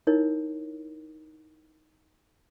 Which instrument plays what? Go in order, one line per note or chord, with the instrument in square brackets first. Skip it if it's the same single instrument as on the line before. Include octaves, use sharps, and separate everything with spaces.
[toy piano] D#4 E4 A#4 C#5